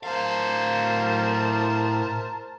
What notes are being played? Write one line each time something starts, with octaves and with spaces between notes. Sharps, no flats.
A2 A#4 C5 F5 A5